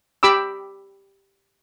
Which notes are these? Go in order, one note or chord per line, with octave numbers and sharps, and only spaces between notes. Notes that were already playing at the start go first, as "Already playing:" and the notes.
G4 B5 D6 E6